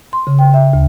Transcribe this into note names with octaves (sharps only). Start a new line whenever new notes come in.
C6
C#3
G5
E5
D2